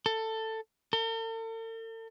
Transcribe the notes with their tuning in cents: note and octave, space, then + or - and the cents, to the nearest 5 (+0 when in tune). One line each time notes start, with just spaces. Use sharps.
A4 +15
A4 +45